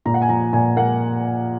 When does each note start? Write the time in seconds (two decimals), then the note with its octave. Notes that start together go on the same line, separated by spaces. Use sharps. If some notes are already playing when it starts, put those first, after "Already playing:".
0.05 A#2 A#5
0.14 F#5
0.22 G#5
0.29 F3 A#5
0.53 A#2 G#5
0.76 A#3 F#5